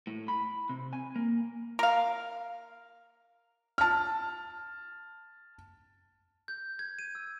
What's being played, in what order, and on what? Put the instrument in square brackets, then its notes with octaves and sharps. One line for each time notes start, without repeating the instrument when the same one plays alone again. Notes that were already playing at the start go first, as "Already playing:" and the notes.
[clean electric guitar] A2
B5
C3
G#5
A#3
[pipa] A#4 F5
[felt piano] A5 F6
[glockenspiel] G6
G#6
D#7
E6